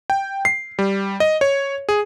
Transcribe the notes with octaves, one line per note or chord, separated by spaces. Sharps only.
G5
C7
G3
D#5
C#5
G#4